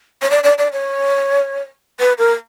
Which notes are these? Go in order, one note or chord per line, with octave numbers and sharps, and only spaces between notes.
C#5
D5
D5
D5
C#5
B4
A#4